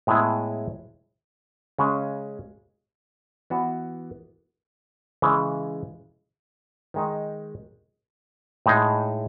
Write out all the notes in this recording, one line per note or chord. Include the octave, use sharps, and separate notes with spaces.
A2 G#3 B3 E4 G#4
C#3 G#3 C#4 G#4
E3 B3 F#4
C#3 E3 G#3
D#3 G#3 D#4
A2 G#3 D#4 G#4